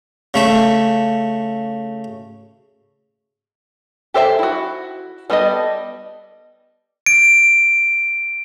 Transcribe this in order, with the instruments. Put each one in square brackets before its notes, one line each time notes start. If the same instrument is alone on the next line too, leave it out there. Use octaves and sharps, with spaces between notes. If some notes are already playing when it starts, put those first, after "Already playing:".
[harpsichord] C#3 A3 E5
[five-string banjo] G4 A4 C5 D5 E5
E4 F#4
G3 B3 A4 D5 D#5
[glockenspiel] D7